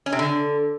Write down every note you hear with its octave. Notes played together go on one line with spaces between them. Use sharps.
C#4
C3
D3